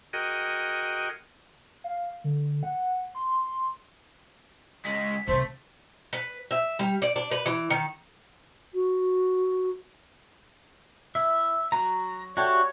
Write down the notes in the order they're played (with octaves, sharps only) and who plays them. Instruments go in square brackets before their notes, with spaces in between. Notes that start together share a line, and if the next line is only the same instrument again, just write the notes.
[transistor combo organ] F#4 G#4 A#4 D#5 G5
[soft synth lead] F5
D3
F#5
C6
[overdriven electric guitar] C#2 G#3 [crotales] B6
[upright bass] E2 C3 [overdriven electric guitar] A3 [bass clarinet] C5
[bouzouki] B4
E5
G3
D5
D4
B4
E3
D#3
[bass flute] F#4
[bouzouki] E4 [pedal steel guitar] E5
[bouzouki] F#3 F#4 [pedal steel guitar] A#5
[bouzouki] A3 D4 G4 [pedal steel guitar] F#4 [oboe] C#5